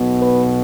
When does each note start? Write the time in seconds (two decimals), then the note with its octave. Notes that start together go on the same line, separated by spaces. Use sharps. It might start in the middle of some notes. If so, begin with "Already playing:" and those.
Already playing: B1 B2 B3
0.21 B4